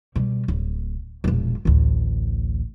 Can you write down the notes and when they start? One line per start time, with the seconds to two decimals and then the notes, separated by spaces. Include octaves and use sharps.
0.16 B2 G3
0.48 D1
1.24 E1 A#1
1.65 A1 D2